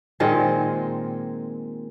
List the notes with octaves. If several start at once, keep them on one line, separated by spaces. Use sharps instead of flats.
A#2 D#3 G#3 C4